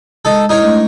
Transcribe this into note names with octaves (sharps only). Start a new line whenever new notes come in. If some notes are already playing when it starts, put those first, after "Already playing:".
G#3 D#4 A4
D#4 E4 A#4 C#5
A3 D4 D#5